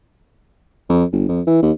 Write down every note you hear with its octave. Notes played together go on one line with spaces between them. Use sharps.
F2
G1
F2
E3
D#2